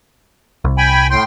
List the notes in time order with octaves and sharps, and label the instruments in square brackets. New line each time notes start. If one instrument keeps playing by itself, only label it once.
[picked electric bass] C2
[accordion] G5 G#5 B5
A2 G5 C6